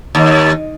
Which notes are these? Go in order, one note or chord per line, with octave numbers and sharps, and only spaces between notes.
D#2